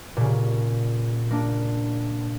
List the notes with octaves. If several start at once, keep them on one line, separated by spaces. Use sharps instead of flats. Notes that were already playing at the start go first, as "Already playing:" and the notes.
A#2 C#3
A#3 D4